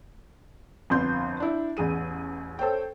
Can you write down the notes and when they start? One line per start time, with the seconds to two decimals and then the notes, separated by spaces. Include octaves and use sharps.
0.90 G1 F2 B3 C6 G6
1.40 D4 E4
1.77 A1 E2 G#4 D#7
2.59 A4 C5 C#5 G5